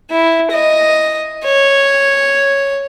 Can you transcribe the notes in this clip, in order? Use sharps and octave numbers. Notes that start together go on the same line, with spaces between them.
E4
D#5
C#5